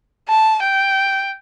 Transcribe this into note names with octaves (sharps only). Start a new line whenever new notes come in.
A5
G5